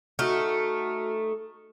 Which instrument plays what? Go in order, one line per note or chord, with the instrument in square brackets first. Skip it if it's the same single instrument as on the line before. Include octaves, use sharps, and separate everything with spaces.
[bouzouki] A3 D#4 [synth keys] F#4 F6